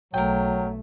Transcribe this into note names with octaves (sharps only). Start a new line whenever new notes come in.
B1 F#3 A3 A#4 G5